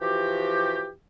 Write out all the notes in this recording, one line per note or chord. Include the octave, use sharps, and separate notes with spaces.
E3 F3 F#4 G4